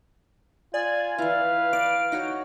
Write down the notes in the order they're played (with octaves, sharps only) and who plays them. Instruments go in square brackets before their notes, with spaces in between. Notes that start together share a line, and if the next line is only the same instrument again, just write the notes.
[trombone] F4 [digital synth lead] D5 [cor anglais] G#5
[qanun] E3 E4 [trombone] B4 [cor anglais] F5
[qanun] D5 [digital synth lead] D7
[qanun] D#4 F#4 C#5